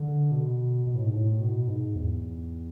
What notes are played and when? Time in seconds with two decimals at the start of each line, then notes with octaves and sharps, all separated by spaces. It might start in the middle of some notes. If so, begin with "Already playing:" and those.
Already playing: D3
0.31 B2
0.87 B2
0.95 A2
1.04 G#2
1.13 A2
1.41 B2
1.68 G#2
1.96 E2